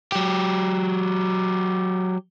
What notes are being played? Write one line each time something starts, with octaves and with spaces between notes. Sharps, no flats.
F#3 G4